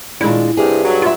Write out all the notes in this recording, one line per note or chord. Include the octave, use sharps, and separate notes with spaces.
A#2 D#3 G#3 D4 E4
G2 C3 G#4
F#3
F4 B4 E5